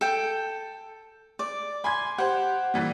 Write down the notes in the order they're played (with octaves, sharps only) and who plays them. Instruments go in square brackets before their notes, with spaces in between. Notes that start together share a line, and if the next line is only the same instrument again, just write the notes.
[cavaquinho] A4 G5
D5
[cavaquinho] G#5 [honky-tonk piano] B5 C6 G#6
[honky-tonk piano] G4 C5 [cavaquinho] F#5
[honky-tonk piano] A#2 E3 G3